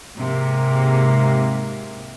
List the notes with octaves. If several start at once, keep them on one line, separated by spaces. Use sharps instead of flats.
G#2 C3 A#3